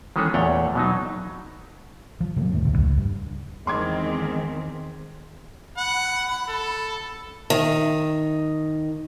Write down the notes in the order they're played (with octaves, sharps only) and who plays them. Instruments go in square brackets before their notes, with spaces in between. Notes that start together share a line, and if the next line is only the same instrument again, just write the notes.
[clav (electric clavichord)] D#3 E3 G#3 C#4 G#4 A4
E2 A#2 A3 C#5 F#5 G5
B2 F#3 D#4
[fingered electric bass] F3
C3 F#3 G#3 A#3
D2 A2 C3 D#3
E1 D2
C#2
G2
[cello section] E2 D#3 C4 [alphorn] G#3 [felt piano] C6 D6 G#6
[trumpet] F#5 [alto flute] B5
[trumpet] A4
[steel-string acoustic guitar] D#3